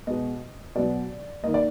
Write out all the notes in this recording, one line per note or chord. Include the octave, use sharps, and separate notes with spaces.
B2 G#3 B3 D#5
B2 F#3 B3 D5
D#3 A#3 D#5
D5